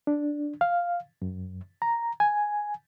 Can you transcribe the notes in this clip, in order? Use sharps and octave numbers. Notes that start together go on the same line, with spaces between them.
D4
F5
F#2
A#5
G#5